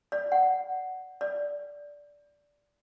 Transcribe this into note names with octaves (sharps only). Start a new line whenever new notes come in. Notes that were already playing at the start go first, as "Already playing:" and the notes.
D5
F#5
D5